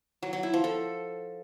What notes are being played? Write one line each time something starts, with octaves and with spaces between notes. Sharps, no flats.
F#3
F#3
E4
F3
A4